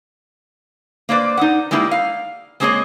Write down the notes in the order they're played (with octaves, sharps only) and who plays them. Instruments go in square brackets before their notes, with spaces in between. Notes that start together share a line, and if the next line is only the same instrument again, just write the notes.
[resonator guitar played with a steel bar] A#3 B4 C5 D5
D#4 F#5
G3 G#3 A#3 D#4 E4
F5
G#3 A#3 C4 G#4 C#5 D#5